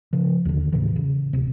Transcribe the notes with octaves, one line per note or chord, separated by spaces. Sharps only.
C#3 F3
D#2 D3
E2 A2 C#3 E3
C#3
D1 C3